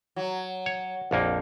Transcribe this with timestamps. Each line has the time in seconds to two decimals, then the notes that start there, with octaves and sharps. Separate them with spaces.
0.16 F#3
0.66 C#5
1.11 A#1 F2 A#3